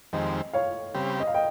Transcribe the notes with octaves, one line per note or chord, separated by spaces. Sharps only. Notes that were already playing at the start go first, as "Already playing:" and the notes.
F2 D#3 G#3 C4 G4 D#5
C#5 F5
C#3 G3 C4 G4
D#5
F5
D#5 G5